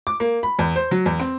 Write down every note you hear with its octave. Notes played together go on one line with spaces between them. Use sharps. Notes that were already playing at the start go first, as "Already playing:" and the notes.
D6
A#3
B5
E2
C5
F#3
E2
C4